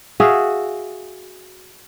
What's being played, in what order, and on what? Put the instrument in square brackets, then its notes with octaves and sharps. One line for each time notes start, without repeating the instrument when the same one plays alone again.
[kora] F#4 G#4 E5 F5